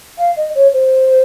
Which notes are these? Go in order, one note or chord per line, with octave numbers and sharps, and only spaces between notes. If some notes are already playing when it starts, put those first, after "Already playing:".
F5
D#5
C#5
C5